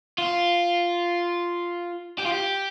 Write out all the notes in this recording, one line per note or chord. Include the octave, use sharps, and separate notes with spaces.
F4
G4
F4
G4